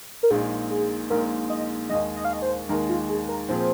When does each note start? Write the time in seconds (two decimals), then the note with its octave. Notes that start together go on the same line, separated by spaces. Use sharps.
0.23 A#4
0.30 A#1 A#2 G#3 D#4 G#4
0.70 G#4
1.10 A#1 A#2 G#3 D#4 A#4
1.50 D#5
1.89 D#2 D#3 G#3 D#5
2.16 D#5
2.25 F5
2.33 D#5
2.42 C5
2.69 D#2 D#3 G#3 A#4
2.89 F4
3.09 G#4
3.29 A#4
3.49 A#2 F3 C4 F4 G#4 C5